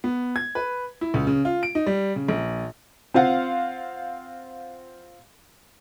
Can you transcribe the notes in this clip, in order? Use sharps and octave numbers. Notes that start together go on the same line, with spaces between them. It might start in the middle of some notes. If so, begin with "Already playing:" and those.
B3
G#6
B4
E4
C#2
C#3
F4
D7
D#4
G3
C#3
A#1
C4 F4 F5 F#5